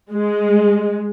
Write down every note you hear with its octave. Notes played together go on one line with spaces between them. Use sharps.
G#3